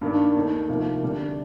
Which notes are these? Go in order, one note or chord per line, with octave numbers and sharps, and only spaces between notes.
G2 D#3 A#3 D4
D#2 D#3 A3 D#4
C2 C3 F3 A#3 D#4
D2 C3 G3 D4